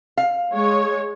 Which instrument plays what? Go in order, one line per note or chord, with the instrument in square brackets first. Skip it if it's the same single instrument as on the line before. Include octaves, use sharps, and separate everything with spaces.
[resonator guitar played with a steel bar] F5
[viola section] G#3 C#5